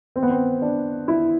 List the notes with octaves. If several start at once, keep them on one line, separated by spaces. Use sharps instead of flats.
C4
B3
C4
D4
E4